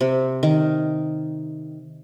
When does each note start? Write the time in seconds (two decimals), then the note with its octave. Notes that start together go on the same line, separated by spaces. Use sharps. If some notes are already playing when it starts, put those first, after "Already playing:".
0.01 C3
0.43 D#3